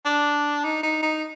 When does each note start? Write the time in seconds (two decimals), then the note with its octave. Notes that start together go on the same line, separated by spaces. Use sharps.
0.06 D4
0.65 D#4
0.83 D#4
1.03 D#4